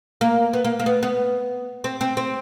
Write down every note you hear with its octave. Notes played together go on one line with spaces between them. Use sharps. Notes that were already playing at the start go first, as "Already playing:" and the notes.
A#3
B3
A#3
A#3
B3
B3
C4
C4
C4